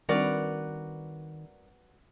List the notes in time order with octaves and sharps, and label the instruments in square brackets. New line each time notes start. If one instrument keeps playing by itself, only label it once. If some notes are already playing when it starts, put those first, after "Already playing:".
[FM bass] D#3 [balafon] G3 C4 D4 [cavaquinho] F#4 B4 [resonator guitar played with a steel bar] A#4 D5